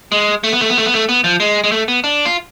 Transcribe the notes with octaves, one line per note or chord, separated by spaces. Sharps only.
G#3
A3
B3
A3
B3
A3
B3
A3
B3
F3
G#3
G#3
A3
B3
D4
F4